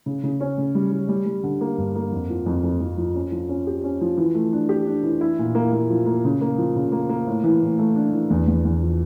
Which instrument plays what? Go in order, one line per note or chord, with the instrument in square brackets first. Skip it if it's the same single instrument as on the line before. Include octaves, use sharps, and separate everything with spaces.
[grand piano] C#3
C#3
C#4
C#3
G3
G3
G3
G3
D3
A#3
G2
A#3
F2
F3
F2
F2
F2
F3
C#4
F3
C#4
G4
C#4
F3
E3
A3
D4
G4
D4
E3
E4
A#2
A#3
A#3
F3
A#3
C#3
A#3
F3
C#3
A#3
A#3
A2
E3
A2
A3
D4
E3
E2
E2
E2
F3